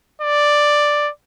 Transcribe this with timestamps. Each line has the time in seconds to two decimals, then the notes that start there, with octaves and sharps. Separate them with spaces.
0.22 D5